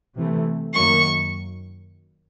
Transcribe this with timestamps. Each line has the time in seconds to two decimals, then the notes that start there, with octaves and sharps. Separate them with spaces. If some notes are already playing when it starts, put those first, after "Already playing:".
0.16 C3 E3 A3
0.74 F#2 D#3 F#3 A#3 C#6